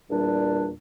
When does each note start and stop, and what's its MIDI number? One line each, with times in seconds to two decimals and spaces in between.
0.10 0.70 40
0.10 0.70 46
0.10 0.70 55
0.10 0.70 62